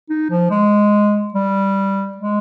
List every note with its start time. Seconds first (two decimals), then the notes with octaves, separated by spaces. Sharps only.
0.10 D#4
0.30 F3
0.51 G#3
1.34 G3
2.17 G#3